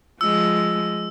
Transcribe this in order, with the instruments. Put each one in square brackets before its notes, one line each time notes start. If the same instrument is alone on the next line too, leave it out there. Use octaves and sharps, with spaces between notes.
[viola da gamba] F3 G#3 [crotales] E6